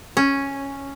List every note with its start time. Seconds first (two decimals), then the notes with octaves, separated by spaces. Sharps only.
0.17 C#4